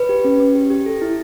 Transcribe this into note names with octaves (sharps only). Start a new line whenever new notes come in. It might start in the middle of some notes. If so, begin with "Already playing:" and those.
Already playing: B4
G4
C#4
C#4
G4
G4
A4
E4